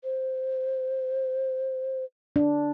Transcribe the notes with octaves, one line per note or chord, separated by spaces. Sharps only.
C5
D4